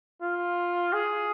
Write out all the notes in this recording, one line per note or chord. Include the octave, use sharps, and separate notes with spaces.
F4
G#4